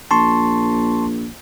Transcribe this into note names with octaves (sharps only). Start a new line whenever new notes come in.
A#1 A5 C6 C#6